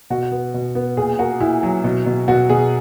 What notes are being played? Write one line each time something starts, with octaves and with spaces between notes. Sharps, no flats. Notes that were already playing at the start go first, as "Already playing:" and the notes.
B2 F#4
B3
B2
B3
A#2 G#4
A#3 F#4
A#2 E4
F#3
B2
B2
B2 F#4
B2 G#4